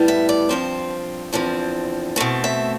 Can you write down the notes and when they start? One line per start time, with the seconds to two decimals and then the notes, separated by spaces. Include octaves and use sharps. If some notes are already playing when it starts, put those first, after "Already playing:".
Already playing: A2 G3 B3
0.08 E5
0.29 D5
0.49 G2 F3 C4 C5
1.33 E2 D3 F3 C4
2.16 B2 A3 C4
2.44 E5